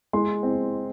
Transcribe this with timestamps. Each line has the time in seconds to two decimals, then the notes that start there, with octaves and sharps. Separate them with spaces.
0.13 G#3 C6
0.43 C4